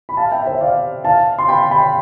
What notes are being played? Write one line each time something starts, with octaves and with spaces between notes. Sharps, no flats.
B5
F5 A5
E5 G5
C5 E5
D5 F5
F5 A5
C6
G5 B5
G5 B5